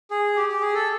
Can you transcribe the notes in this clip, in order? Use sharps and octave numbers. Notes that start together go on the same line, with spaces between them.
G#4
G4
G4
G#4
A4